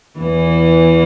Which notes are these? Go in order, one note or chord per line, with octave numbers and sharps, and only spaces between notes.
E2 E3